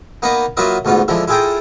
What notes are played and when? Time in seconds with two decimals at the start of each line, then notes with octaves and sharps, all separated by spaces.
0.22 A#3 B3 D#4 B4 A#5
0.57 F#3 A#3 F4 B4 D#5 E5
0.85 D2 G#2 B3 F4
1.08 D3 F3 G#3 E4
1.28 E4 F4 G#4 A4 G5 A#5